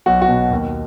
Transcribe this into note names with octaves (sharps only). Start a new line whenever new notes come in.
B1 F#4
F#4
B2
D#2